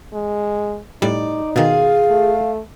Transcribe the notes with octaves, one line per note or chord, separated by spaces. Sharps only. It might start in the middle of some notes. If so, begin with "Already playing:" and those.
G#3
A2 G3 D#4 D5
B2 D#3 F4 G#4 F5
A3